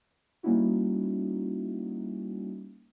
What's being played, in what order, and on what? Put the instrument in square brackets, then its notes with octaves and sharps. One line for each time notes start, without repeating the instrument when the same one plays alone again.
[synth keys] G3 A#3 C#4 D#4 E4 F#4